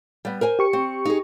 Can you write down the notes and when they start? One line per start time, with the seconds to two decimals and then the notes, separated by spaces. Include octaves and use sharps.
0.25 G3 B3
0.41 A#4 C5 G#5
0.59 G4 C#6 C#7
0.73 C4
1.05 D#4 G#4